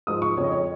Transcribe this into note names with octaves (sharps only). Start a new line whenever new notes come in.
G#2 F3 D#6
C#6
F2 C#3 F3 C#5
D#5
C#5